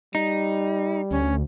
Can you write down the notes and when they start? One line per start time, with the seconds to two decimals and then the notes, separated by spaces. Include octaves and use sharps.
0.15 G3 D#4
1.11 D2 C#4